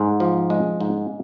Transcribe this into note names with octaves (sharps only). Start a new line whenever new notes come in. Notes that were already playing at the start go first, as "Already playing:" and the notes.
Already playing: G#2
F3
G#3
G#2